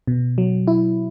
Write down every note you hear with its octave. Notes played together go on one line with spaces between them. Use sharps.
B2
F#3
E4